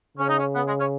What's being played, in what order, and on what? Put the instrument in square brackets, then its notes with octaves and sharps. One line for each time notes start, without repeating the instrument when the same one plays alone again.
[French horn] C#3 [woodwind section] C#4
[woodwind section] D#4
C#4
B3
G#3
C#4